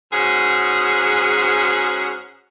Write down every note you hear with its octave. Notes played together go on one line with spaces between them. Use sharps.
G#2 C#4 F#4 G#4